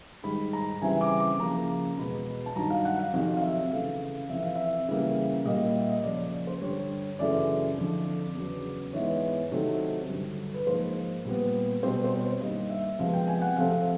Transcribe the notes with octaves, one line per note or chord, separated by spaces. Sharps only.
G#2 D#3 G3 B5
A#5
C#3 E3 G3 C4 G#5
D6
D6
C#3 F3 A#3 A#5
E2 B2 G#3 B3 B5
A5
G2 D#3 F#3 A#5
F5
F#5
F5
F2 C3 D#3 F#3 F5
F5
E5
C#3 E3 A3 F5
F5
F2 C3 E3 E5
F5
E5
C#3 E3 G3 A#3
A#2 G3 A#3 D#5
E5
D#5
C#3 F3 A#3 D5
C#5
D5
D5
C5
G2 D3 G3 C#5
F#2 C#3 E3 A3 D5
F2 D3 F3
E2 C#3 F#3 B3
G#2 E3 G#3 B3 C#5
C3 D#3 F#3 A3 C4
G2 D3 F#3
B4
G#2 F3 A#3 C5
A#2 G3 B3
B2 G3 C4 C5
C5
C#5
G2 D#3 G3 A#3 D#5
E5
F2 C3 F3 G#3 B3 F5
G5
G#5
F#5
C3 F3 A3 C4 F5